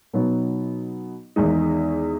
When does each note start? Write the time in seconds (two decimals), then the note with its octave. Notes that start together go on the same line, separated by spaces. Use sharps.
0.13 B2 F#3 B3 D#4
1.36 E2 D#3 G#3 D#4